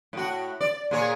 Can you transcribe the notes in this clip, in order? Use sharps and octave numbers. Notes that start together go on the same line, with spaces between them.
A2 F#4
D5
A#2 G#4 C#5